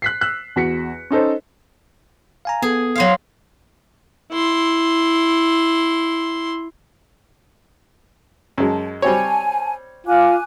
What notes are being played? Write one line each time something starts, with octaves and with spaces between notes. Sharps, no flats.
F#6 B6 C7
E6 F#6
E2 F#4 B6 C#7
C#4 D#4 A4 C5
F5 G#5 A#5
B3 G#4 A4
F#3 C5 F5
E4 C6
F#2 G#3 A5
G3 C4 C#5 G#5 A5
F4 F5 G#5 D6 F#6